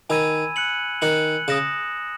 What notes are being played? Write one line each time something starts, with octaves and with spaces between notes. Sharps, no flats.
D#3 G#5 B5 E6 G#6 D#7
F#6 C#7 F#7
D#3 F#6 C#7 F#7
C#3 D#6 A#6 E7